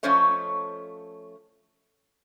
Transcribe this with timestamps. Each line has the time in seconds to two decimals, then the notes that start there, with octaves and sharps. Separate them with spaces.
0.03 F3 A3 C#4 C5 C#5 D#5